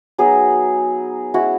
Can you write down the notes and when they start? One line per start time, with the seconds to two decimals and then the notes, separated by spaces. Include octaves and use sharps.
0.18 F#3 B3 D#4 G#4
1.34 G#3 C#4 E4 F#4